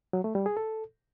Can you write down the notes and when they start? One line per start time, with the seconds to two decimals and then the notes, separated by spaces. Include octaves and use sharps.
0.13 F#3
0.24 A3
0.35 G3
0.46 G#4
0.57 A4